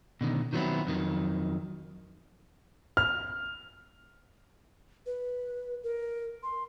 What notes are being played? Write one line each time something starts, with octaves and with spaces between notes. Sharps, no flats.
B2 D3 D#3
D#3 F3 F#3 B3 C4 E4
F2 D#3 F#3
F6
B4
A#4
C6